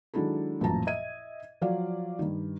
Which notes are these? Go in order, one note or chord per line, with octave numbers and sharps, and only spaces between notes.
D#3 F#3 G#3 D4 E4 A4
A1 F#2 A#2 F3 A5 A#5
D#5 E5 G#6 D#7
F3 F#3 D5 F5
G2 D#3